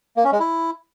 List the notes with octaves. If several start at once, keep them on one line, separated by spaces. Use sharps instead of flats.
A#3
C#4
G#3
E4